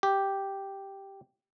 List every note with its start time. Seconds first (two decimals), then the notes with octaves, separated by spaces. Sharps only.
0.03 G4